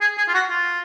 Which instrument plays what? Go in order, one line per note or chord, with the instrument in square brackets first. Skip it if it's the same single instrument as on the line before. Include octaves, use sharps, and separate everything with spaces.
[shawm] G#4
G#4
F4
F#4
F4